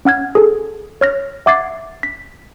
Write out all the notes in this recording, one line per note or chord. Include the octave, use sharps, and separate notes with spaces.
C#4 F#5 F6 G#6
G#4 A4
C#5 F6 A#6
E5 F#5 D6 G#6 A6 C7
B6